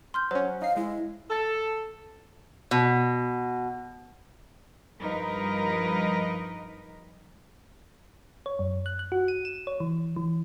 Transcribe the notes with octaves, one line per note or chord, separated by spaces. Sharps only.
C6 F6 G6
F#3 C#4 C5
D#4 F5 C7
G#3 E4
A4
B2
G2 F3 D#4 A#4 B4 D#5
C#5
F#2
F#6
F#6
F#4
D#7
E7
C#5
E3
E3